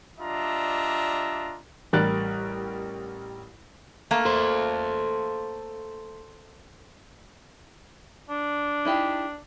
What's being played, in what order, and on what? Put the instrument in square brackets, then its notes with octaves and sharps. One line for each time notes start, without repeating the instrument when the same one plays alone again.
[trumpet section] G3 D4 F4 D#5 E5 A#5
[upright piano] A1 G3 A#4 F#6 A6
[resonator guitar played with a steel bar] A3 A#3 F5
[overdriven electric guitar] A4 C5
[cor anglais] D4
[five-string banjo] D#4 E4 G4